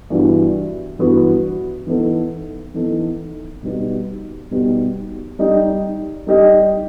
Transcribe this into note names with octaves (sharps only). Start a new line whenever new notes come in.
G2 E3 B3 F#4
G2 E3 B3 F#4
E3 B3 D#4 A4
E3 B3 D#4 A4
B2 G3 B3 D#4 G4
B2 G3 B3 D#4 G4
G3 D#4 G4 D#5
G3 D#4 G4 D#5